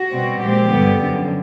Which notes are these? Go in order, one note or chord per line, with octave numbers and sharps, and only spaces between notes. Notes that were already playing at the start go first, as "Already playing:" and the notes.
Already playing: F#4
B2 G3 C4
A#2 F3 G#3 C4 G4
G2 D3 G3 B3
F#2 D3 F3